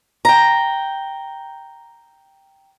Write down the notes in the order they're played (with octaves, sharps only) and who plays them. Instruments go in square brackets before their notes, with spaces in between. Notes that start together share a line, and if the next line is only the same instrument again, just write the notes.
[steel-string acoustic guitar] G5 A#5